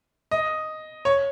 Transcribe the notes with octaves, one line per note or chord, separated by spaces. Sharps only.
D#5
C#5